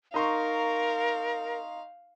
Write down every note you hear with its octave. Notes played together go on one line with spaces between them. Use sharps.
D#4 A#4 F5 C6 C#6